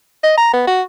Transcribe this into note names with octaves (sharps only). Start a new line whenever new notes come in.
D#5
A#5
B3
F#4